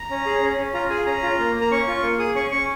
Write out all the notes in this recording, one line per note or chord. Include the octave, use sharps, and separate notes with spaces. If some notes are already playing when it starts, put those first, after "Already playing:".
Already playing: A#5
C#4
G#4
C#4
C#4
F4 A#5
G#4 G#5
C#4 A#5
F4
A#3
A#3
A#5
C#4 C#6
F4
A#3
G#4 D#6
C#4 C#6
C#4 C#6